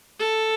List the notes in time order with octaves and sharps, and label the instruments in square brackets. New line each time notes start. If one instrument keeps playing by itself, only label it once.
[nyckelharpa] A4